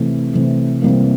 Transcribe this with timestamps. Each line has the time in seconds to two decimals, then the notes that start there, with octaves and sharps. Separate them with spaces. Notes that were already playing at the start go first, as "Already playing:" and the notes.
Already playing: C3 E3 A3
0.33 C3 E3 A3
0.82 C3 E3 G3 A#3